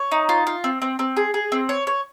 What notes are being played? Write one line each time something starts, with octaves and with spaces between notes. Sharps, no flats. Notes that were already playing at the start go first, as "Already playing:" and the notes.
Already playing: C#5
D#4
F4
F4
C4
C4
C4
G#4
G#4
C4
C#5
C#5